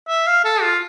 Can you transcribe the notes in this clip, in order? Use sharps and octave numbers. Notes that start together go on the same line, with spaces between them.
E5
F5
A4
F4